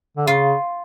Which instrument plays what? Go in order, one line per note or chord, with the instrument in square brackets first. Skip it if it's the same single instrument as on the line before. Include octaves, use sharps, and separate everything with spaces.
[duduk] D3
[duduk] C#3 [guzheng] F4